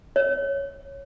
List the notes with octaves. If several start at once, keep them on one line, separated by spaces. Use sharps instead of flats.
C#5